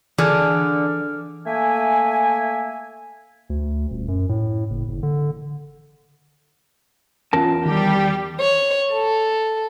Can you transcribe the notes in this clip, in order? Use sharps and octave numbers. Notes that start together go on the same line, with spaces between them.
D3 E3 G#4 D6 F6
A3 A#3 E5 G#5
D2
D#1
F#2
A2
F#1
F#1
D3
E2 C#4 F4 A#4 A5
D#3 G3 G4
C#5
A4